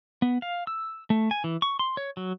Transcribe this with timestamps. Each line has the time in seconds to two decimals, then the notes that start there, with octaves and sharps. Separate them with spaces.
0.22 B3
0.42 F5
0.67 E6
1.10 A3
1.31 G#5
1.44 E3
1.62 C#6
1.79 C6
1.97 C#5
2.17 F#3